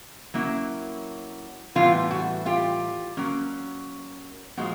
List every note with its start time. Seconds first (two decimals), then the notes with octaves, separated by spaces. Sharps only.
0.34 F#3 A#3 C#4 E4
1.75 A2 E3 G3 B3 F4
2.11 F#4
2.46 F4 G4
3.17 F#3 A#3 C#4
4.57 A#2 F3 G#3 F#4